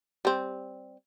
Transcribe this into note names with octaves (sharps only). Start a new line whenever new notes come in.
G3 C4